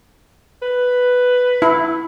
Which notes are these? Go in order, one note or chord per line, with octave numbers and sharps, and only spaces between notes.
B4
E4